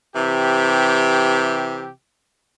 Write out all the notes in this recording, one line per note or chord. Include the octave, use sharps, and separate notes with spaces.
C3 E3 G4